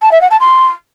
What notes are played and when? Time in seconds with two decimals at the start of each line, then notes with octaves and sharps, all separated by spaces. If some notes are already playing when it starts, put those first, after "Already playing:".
0.02 A5
0.11 E5
0.21 F#5
0.30 A5
0.40 C6